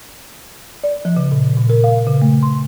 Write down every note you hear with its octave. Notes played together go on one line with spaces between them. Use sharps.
D5
F3
C#3
A#2
A#2
A#4
F5
C#3
A3
C6